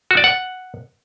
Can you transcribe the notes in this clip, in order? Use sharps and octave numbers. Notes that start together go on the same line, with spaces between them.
F#4
D5
F#5